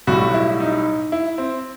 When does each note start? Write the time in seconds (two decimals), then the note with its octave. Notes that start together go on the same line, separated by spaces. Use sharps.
0.07 B1 A2 G3 F#4
0.34 E4
0.60 D#4
1.12 E4
1.38 C4